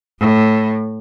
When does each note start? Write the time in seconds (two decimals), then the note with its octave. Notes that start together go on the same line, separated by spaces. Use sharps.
0.19 A2